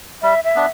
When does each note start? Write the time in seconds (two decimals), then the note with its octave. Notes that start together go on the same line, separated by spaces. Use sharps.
0.22 G3 E5
0.44 E5
0.55 B3 D4